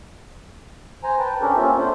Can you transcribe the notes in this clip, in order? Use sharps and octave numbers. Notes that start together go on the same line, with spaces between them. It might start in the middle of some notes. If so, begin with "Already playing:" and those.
C5 G#5 A#5
B4 G5 A5
C#4 D4 G4 A4 A#4
A#3 C4 C#4 F4 E5
D4 A4 C5